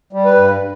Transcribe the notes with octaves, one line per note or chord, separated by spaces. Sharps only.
G3
B4
G2